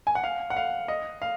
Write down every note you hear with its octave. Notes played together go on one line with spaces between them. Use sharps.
G#5
F#5
F5
F#5
F5
D#5
F5